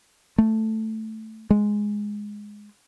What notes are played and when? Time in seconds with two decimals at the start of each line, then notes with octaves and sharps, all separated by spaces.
0.38 A3
1.50 G#3